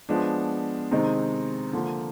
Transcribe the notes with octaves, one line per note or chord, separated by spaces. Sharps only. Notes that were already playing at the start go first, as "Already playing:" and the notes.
F3 G#3 B3 D4
C3 D#3 G#3 C4 D#4
D3 F3 A#3